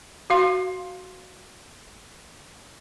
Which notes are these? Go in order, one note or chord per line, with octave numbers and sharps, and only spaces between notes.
F#4 F5 C6